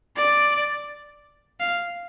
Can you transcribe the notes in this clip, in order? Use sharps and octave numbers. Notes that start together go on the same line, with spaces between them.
D5
F5